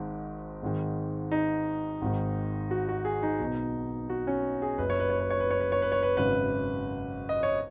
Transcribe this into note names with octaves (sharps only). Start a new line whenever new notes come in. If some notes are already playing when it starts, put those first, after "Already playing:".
Already playing: G#1 G#2 D#3
G#1 G#2 D#3
D#4
G#1 G#2 D#3
F#4
F#4
G#4
D#4
B1 B2
F#4
C#4
G#4
F#1 F#2 C#3 B4
C#5
B4
C#5
B4
C#5
B4
C#5
B4
C#5
B4
C#5
B4
G#1 F#2 C#3 B4
D#5
C#5